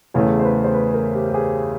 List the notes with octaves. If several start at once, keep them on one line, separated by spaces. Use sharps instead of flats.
E2 C#3 E3 A3 C#5
C5
B4
C5
B4
A#4
G4
G4
G#4